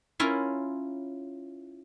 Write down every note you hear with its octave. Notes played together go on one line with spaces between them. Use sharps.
C#4 E4 F4 A#4